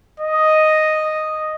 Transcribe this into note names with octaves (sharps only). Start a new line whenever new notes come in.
D#5